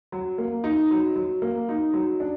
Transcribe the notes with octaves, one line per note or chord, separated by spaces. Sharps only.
F#3
A#3
D#4
F#3
F#3
A#3
D#4
F#3
D4